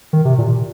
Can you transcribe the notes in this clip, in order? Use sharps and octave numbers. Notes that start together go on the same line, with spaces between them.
D#3
C3
A#2